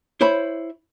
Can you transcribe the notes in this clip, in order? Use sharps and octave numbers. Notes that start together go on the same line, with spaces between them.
E4 C5 C#5 B5